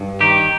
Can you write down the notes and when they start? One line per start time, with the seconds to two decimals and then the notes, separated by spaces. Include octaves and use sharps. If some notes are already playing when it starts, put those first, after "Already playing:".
Already playing: G2
0.20 D#3 G4